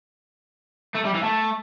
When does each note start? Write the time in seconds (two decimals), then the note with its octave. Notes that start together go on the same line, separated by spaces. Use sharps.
0.95 A3
1.05 G3
1.14 E3
1.23 A3